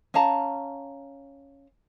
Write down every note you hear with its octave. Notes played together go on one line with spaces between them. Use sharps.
C#4 F5 A5 A#5